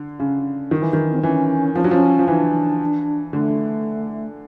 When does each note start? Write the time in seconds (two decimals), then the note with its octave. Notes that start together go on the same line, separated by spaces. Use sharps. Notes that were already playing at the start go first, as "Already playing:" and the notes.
Already playing: D3
0.19 C#3
0.71 D#3
0.82 E3
0.93 D#3
1.12 C4
1.23 E3 C#4
1.75 F3 C#4
1.84 F#3 D4
1.91 F3 C#4
2.19 F3
2.28 E3 D4
3.33 D3 A3